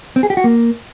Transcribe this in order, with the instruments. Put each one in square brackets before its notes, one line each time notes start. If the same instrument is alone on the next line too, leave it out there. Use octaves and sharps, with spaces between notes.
[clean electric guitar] C4
G#4
G4
F#4
A#3